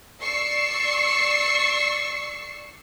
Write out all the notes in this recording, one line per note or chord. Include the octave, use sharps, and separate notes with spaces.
D5 C#6 E6 C7